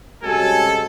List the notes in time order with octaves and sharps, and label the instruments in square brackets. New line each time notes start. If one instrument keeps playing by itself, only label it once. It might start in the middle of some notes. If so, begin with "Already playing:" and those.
[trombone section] C3 G3 G#3 [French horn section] C#4 F#4 [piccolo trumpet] A4 [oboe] G#5